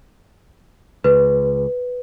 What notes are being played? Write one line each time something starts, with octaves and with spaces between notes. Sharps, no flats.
C#2 B4